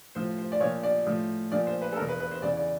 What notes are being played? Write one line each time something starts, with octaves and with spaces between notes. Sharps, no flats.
A2 F3 C5
C5
D5
A#2 F3 C#5
D5
A2 F3
A#2 F3 D5
C5
B4
A4
E2 B2 A#4
B4
B4
C5
E2 C#3 E3 D5
D5